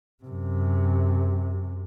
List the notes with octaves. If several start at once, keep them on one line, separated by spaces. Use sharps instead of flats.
F#2 C3